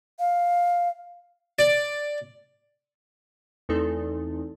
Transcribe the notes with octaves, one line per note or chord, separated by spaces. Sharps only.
F5
D5
E2 A3 C4 D#4 A4